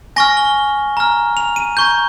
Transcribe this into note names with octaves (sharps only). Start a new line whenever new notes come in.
G#5 C#6 F6 A#6
G7
A#5 F6
F7
D#7
A#5 C#6 G6